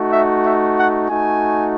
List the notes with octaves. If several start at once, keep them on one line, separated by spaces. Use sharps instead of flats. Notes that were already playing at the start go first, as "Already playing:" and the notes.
Already playing: A3 D#4 F#4
E5
E5
F#5
A3 D#4 F#4 G#5